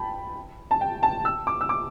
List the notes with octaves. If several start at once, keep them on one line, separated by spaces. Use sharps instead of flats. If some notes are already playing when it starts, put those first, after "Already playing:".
Already playing: G5 A5 B5
A5
G5
A5
E6
D6
E6
D6